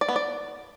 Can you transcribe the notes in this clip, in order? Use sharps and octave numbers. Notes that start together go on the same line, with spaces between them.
D5
B3
D5